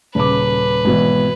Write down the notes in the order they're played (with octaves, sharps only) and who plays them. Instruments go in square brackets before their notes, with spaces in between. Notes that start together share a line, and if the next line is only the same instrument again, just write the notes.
[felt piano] D#1 C#3 D6 [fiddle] B4
[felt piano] G#1 B2 E3